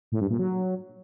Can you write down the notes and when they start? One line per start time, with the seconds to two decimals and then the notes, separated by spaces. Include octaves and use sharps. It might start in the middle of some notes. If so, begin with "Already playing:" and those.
0.12 A2
0.21 G2
0.30 A#2
0.39 F#3